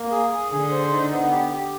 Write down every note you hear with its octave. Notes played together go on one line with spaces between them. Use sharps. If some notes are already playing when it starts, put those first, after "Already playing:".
Already playing: A#3
G#4
G#4
D3 G#4
C5
D#4
B3
G4
G4